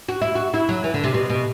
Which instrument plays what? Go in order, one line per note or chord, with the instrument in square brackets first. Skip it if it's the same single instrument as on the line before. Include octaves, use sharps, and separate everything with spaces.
[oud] F#4
E4
F#4
E4
F#3
E3
D3
C3
B2
B2